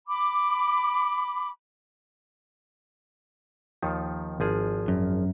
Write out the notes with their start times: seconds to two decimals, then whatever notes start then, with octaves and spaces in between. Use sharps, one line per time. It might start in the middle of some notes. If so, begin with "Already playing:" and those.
0.08 B5 D6
3.83 D#2 D#3 F3
4.40 G#1 F3 G#4
4.88 F#2